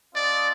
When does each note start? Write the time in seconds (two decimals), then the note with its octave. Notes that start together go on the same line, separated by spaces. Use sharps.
0.15 C4 F4 A4 D5 D#5